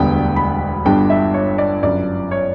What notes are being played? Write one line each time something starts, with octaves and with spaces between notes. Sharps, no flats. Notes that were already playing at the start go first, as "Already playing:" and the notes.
Already playing: E1 D2 D3 G3 B3 G5
B5
G1 G2 D3 G3 B3 G5
E5
C#5
D5
G1 F#2 D3 D5
C#5